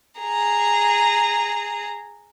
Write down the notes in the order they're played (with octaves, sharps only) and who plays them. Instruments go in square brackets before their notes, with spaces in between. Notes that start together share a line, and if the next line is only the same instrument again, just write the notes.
[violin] G#4 A#5